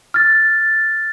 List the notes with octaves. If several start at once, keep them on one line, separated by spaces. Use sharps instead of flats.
F6 A6